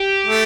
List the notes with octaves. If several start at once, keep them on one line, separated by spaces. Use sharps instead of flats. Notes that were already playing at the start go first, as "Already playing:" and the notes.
Already playing: G4
A3 A4